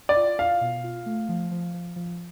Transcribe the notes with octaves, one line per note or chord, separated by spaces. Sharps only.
D5
F4
F4 F5
B2
F4
A3
F3
F3
F3
F3